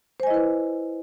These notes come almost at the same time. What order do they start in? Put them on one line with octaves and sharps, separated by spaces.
C5 G#5 D#5 E4 B4